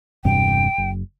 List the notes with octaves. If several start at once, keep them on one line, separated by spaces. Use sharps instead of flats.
E1 G2 C3 G5
F#1